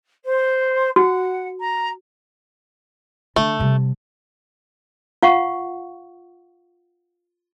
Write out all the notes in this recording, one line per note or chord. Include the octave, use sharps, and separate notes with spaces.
C5
F#4 F#5
A#5
D3 A3
C3 G3
F4 F5 F#5 C#6